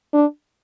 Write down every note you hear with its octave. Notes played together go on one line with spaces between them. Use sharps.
D4